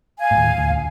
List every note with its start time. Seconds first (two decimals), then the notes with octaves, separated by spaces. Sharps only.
0.19 F5 G#5
0.31 D#2 A2
0.58 D2
0.71 C#2